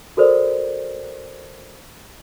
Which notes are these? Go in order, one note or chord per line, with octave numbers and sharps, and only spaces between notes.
F#4 A4 A#4 C5 D5